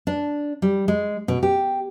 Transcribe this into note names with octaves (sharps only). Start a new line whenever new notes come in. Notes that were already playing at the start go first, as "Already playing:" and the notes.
D4
G3
G#3
B2
G4